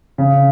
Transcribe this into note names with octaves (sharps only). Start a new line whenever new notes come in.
C#3